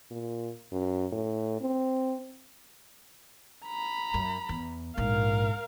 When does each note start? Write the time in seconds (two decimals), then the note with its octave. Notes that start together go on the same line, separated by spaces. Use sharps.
0.11 A#2
0.72 F#2
1.12 A2
1.61 C4
3.66 A#5 B5
4.14 F#2
4.49 E2
4.97 A#1 G#2 A#4 F5